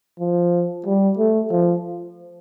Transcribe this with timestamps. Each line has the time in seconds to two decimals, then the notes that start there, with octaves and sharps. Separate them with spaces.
0.20 F3
0.86 G3
1.18 A3
1.51 F3